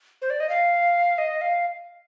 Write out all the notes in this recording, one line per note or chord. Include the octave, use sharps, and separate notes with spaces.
C5
D5
D#5
F5
D#5
F5